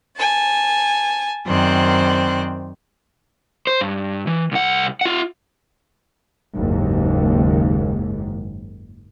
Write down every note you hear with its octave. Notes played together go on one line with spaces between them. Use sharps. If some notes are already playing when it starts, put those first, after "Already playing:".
G#5 A5
F#2 D#3 C4 C5 D5 F#6
C5
G2
E3
C2 F#5
F4 F#5
F#1 D#2 G#2